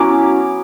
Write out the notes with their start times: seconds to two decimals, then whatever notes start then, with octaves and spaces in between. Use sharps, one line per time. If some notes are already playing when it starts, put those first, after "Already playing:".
Already playing: F#3 B3 C#4 E4 D6